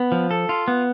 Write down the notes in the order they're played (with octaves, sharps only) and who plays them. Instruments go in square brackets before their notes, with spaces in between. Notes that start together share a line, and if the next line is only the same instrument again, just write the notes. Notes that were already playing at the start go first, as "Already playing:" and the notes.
Already playing: [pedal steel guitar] B3
F3
A4
F4
B3